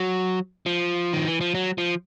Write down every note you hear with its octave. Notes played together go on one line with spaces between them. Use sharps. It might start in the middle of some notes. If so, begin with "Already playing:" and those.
Already playing: F#3
F3
D#3
E3
F3
F#3
F3